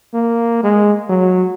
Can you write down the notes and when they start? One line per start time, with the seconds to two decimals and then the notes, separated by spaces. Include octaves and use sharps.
0.14 A#3
0.64 G#3
1.09 F#3